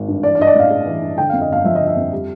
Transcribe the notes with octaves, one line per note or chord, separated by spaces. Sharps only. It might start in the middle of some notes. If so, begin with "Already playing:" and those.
Already playing: G#1
G2
E3 D5
D5
G2 D#5
D5
A1 F5
G#3
E3
G2
D3 G5
F5
F2
D#5
G1 F5
F3 E5
D#5
D3
E5
F2
G3